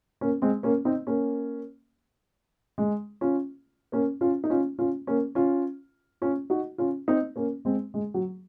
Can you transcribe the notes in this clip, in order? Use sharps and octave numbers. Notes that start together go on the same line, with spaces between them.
A#3 C#4
G#3 C4
A#3 C#4
C4 D#4
A#3 C#4
G#3
C#4 F4
A#3 C#4
C#4 F4
D#4
C#4 F4
C#4 F4
A#3 C#4
C#4 F4
C#4 F4
D#4 F#4
C#4 F4
C4 D#4
A#3 C#4
G#3 C4
G#3
F#3